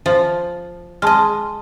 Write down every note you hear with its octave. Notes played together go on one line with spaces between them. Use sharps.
F3
G#3 D#5 A5 C6 F6